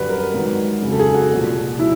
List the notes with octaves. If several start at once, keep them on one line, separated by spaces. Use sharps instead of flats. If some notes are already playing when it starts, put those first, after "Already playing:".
Already playing: F#2 D3 G3 B4
A#4
G#2 D#3 F#3
F2 C#3 F#3
A4
G#4
F#4
C2 A#2 F3
F#3 E4